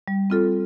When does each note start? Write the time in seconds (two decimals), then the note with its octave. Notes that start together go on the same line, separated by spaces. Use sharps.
0.08 G3
0.30 C4 F4 A4